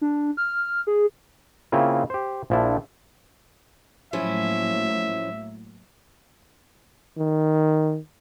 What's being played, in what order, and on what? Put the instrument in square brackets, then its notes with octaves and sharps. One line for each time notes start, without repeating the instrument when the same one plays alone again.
[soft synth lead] D4
F6
G#4
[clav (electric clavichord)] C#3 A#3 C4 E4 F4
G4 C5
A#1 F3 D4 E4
[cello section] A2 F#3 A#3 [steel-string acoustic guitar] F3 C#4 E4 [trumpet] E5
[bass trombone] D#3